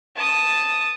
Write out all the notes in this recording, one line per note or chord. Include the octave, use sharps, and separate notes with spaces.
A5 D#6